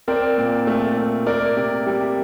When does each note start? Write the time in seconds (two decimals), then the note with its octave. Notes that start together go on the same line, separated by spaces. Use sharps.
0.08 C4 A#4 D5
0.38 A#2
0.67 A3
0.97 A3
1.26 A#3 A#4 D5
1.57 C3
1.86 G3